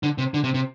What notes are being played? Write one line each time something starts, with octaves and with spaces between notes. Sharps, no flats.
D3
C3
D3
C3
C3